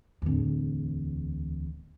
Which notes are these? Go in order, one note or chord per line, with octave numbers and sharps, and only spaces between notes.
D1 E2